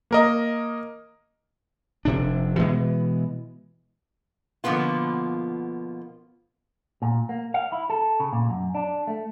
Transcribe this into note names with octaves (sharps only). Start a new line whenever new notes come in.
A#3 A#4 D#5
F1 C3 D4
B2 E3 G#3 B3
B2 D3 F3 A#3 B3 F4
A#2
A#3
F5
E4
A4
C#3
A#2
F#2
D4
A3